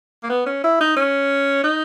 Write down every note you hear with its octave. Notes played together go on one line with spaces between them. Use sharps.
A#3
B3
C#4
E4
D#4
C#4
D#4